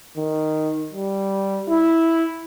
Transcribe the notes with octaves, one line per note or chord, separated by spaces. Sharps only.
D#3
G3
E4